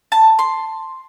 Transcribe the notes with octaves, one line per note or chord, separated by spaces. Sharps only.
A5
C6